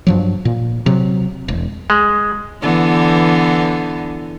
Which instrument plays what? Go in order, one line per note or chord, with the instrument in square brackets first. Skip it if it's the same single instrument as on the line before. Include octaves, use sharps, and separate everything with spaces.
[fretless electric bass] G2 F3 F#3
A#2
C3 F#3
E1
[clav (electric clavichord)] G#3
[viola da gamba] D3 E3 B3